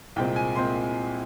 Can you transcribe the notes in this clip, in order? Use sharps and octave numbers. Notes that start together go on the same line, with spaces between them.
C2 A#2 G#3 C4 G5
G#5
A#2 G#3 C4 C6